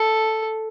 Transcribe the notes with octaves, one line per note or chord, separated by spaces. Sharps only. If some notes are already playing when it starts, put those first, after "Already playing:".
Already playing: A4